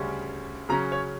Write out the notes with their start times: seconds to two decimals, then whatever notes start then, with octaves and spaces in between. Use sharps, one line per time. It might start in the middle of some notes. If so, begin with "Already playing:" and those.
Already playing: D2 C#3 G3 C#4
0.69 C#3 F#3 C#4 A#5
0.92 C#5